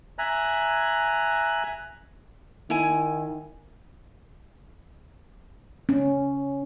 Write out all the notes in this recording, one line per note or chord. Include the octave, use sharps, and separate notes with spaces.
E5 G#5 A#5 F#6
D#3 E4 G#5
C#4